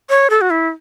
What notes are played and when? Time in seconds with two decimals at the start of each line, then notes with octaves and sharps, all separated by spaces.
0.09 C#5
0.30 A4
0.41 F#4
0.50 E4